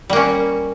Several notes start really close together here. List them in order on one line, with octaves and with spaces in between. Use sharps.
G3 A#3 C#4